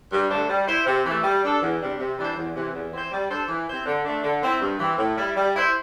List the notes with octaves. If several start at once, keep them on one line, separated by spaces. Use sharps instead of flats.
G2
D3 A3 D4 C5
G3
E4 C5
C3
E3 A3
G3
D4 A4
E2
C3 G3 D4
C3
E3 G3 D4 C5
E2
C3 E3
E2
E3 C4 E4 C5
G3
D4 A4 C5
E3
C4 E4 C5
D3
A3 D4
D3
C4 E4
G2
E3 C4
A2
G3 E4
G3
E4 C5